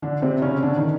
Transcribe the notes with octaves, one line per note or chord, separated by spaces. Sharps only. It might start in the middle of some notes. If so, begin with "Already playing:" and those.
D3 D4
C3 C4
C#3 C#4
D3 D4
D#3 D#4